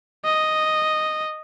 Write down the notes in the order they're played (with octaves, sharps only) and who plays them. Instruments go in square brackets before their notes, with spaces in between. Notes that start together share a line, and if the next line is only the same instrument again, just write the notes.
[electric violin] D#5